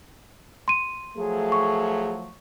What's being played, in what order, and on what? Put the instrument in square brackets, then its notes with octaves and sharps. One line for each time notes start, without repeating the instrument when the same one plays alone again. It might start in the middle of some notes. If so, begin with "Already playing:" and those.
[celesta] C6 D#7
[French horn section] F3 F#3 A3 [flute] G#4
[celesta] C#6